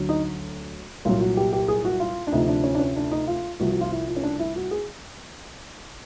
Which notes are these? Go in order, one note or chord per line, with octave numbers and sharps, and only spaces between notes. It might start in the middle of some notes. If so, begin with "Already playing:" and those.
Already playing: D2 D3 F#3
D#4
C2 A#2 F#3 F4
F#4
G4
G4
G#4
F#4
F4
D4
D2 C3 F3 D#4
D4
C#4
D4
C#4
D4
D#4
F4
C2 C3 F3 F#4
F#4
F4
E4
F4
C#4
D4
E4
F#4
G#4